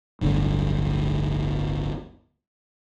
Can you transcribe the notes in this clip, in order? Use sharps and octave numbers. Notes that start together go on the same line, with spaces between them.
D1 G1 D3